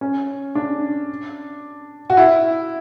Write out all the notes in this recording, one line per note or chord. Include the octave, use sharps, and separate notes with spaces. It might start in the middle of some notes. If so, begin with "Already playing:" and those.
C#4
D4
F#4
E4